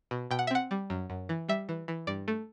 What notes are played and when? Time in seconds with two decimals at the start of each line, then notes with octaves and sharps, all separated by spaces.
0.11 B2
0.31 B2 G5
0.39 F#5
0.47 E5
0.51 C4 F#5
0.71 G3
0.90 F#2
1.10 F#2
1.29 E3
1.49 G3 E5
1.69 E3
1.88 E3
2.07 G2 D5
2.28 A3